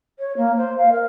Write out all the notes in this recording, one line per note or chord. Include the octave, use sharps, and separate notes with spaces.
C#5
A#3
C5
F5
A#4